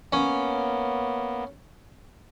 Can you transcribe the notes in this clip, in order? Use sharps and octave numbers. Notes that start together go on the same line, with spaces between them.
A#3 B3 C#4